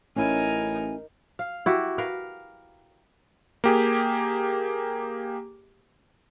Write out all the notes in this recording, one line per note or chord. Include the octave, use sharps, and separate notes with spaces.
A1 C#4 D#4 E4 A#4 G#5
F5
E4 F#4 G4
A#4 B4 F5
A#3 G4 G#4